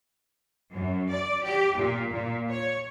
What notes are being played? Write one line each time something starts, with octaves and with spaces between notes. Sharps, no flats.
F#2
D5
G4
A#2
A#2
C#5